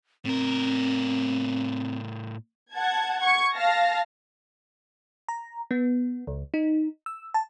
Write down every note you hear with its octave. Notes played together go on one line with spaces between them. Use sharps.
A2 C4 A#4
F#5 A5 G#6
C#6 G#6
F5 A5 A#6
A#5
B3
C#2
D#4
E6
A5